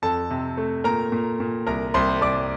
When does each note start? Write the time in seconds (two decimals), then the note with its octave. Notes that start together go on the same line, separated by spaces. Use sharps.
0.02 F2 A4 A5
0.30 C3
0.57 A3
0.84 A#2 A#4 A#5
1.12 A#2
1.40 A#2
1.67 C2 A#4 A#5
1.94 C2 C5 C6
2.21 C2 D5 D6